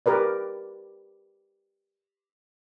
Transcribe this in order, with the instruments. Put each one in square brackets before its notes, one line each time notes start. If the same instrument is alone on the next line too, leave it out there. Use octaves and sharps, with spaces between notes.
[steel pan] G4 A#4 B4 D5